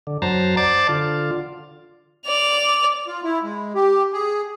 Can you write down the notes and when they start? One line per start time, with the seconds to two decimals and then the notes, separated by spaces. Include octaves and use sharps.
0.07 D3
0.22 F#2 F#3 C5 A5 A#5
0.57 C5 D5 A5 D6 A6
0.89 D3 F4
2.26 D5 F7
3.07 F4
3.24 E4
3.43 G#3
3.75 G4
4.13 G#4